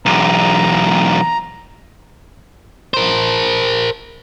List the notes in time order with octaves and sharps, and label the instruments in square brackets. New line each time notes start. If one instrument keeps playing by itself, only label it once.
[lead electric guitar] B1 E2 [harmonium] A#5
[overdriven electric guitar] A#4 C5